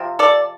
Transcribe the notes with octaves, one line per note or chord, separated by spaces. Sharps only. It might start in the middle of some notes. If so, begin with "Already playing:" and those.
Already playing: C3 F3 C4
A4 D5